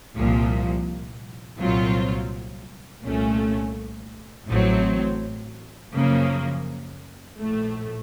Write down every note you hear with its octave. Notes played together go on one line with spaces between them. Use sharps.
C2 A#2 F3
C2 A#2 F#3 C4 F4
C2 A#2 A3 C#4
A1 A2 F#3 C4
F#2 C#3 F3 A#3
A#1 A2 A3